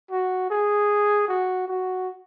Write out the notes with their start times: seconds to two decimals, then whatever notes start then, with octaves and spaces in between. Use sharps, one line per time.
0.11 F#4
0.50 G#4
1.28 F#4
1.68 F#4